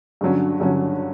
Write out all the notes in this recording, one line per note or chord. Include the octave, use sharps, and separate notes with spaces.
G2 D3 F#3 C#4
G2 D3 F#3 C#4